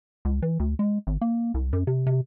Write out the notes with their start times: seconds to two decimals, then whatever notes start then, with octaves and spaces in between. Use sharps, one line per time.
0.25 C#2
0.42 E3
0.60 D2
0.79 G#3
1.07 G#1
1.21 A#3
1.54 C2
1.73 F#2
1.87 C3
2.06 C3